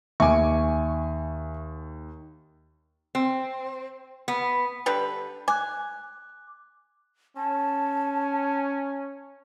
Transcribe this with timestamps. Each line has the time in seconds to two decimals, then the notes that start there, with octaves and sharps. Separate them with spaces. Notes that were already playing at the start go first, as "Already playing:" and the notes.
0.20 D#2 E5 G#5 C#6 D6
3.15 C4
4.28 B3
4.86 D3 G3 B4
5.48 G#5 D6 F#6
7.37 C#4 A5